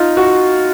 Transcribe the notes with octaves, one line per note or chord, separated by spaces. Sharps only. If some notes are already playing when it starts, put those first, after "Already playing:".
Already playing: D#4 F4
F#4